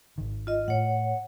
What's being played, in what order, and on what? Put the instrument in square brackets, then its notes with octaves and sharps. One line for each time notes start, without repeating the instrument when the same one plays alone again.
[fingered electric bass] G#1 D#3
[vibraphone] F4 D#5
[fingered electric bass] A2 [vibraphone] C#5 F#5